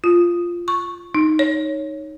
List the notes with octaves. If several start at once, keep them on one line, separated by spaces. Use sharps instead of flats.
F4
C#6
D#4
C#5